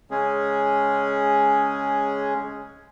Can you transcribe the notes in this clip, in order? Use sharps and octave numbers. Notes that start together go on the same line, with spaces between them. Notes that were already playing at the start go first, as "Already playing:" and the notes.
C#3 G#3 C#4 G#4